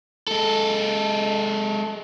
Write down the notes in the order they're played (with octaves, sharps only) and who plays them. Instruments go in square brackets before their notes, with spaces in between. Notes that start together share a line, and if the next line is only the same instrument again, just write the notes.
[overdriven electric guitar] G#3 A4